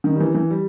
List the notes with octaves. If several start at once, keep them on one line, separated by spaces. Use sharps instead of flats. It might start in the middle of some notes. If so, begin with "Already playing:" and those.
D#3
G3
E3
E3
G3